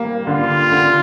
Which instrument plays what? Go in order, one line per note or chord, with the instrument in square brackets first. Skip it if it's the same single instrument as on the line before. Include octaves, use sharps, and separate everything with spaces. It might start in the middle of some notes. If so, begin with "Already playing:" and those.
Already playing: [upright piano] G3 A#3
[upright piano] D3 [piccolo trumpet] F4
[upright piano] D3